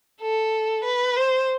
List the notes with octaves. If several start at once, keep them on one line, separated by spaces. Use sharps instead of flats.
A4
B4
C5